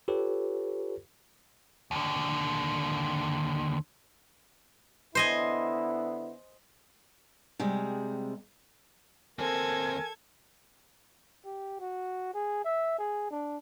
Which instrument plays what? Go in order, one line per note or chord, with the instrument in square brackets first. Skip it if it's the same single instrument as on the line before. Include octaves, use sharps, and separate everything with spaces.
[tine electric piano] F4 G4 A4 B4 C#5
[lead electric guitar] D#2 D3
[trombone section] D3 B3 E4 [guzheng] C5 D#5 G#5
[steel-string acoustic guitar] C3 G3 G#3 G#4
[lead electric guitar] D#2 C4 [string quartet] A4 G#6 [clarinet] A#4 [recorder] G#5
[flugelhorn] G4
F#4
G#4
E5
G#4
D4